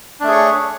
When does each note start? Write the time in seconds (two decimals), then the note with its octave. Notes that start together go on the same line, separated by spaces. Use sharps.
0.20 D4
0.24 A3
0.28 G#4
0.32 C#5